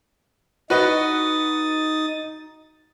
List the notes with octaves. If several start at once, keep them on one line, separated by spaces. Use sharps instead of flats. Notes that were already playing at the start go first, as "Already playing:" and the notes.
D#4 F#4 B4 D#5 D#6 A6